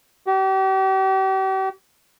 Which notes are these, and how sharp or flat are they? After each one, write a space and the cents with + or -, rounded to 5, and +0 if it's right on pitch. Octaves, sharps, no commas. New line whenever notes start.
G4 -40